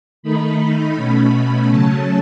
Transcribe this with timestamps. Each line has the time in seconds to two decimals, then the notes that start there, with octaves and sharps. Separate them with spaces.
0.23 D#3 A3 D#4 B5
0.96 B2 A3 C#4
1.69 C#3 F#3 A3 C#4 A5